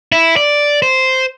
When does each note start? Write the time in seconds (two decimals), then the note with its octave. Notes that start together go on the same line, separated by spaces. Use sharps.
0.12 E4
0.37 D5
0.82 C5